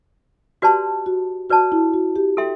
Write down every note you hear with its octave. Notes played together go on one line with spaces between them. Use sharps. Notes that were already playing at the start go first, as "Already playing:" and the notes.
F#4 G4 B4 D5 A5 C6
F#4
F#4 B4 D5 A5
E4
F#4
G4
A4 E5 G5 C6